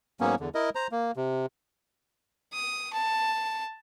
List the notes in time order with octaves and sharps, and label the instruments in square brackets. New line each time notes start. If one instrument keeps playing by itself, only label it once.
[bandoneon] G#2 F#3 A#3 B3 C#4
E2 D3
E4 A#4 D#5
C5 A#5
A#3
C3
[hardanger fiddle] D#6
A5